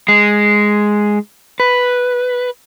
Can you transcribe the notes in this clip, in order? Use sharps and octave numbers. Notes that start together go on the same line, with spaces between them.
G#3
B4